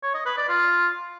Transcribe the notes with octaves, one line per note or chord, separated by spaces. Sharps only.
C#5
D#5
B4
D5
F4